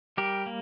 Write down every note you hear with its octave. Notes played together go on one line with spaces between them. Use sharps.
G3 G4 A#4
A#3